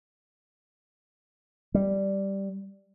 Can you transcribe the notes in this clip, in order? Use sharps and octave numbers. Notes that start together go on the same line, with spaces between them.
G3